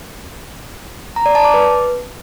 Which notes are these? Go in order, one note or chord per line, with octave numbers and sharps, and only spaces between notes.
A#5
D5
A5
D6
B4